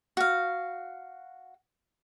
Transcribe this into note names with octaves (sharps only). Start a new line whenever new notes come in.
F#4 F5